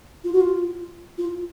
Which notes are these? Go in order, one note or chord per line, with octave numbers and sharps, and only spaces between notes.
F4
F#4
F4
F4